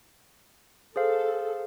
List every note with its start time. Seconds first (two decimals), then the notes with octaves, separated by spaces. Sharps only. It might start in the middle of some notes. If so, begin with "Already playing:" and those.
0.96 G#4 A4 C5 F5